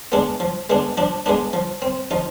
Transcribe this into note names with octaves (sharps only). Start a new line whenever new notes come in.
G#3 B3 D4
F3
G#3 B3 D4
F3 D4
G#3 B3 D4
F3
C4
F3 D#4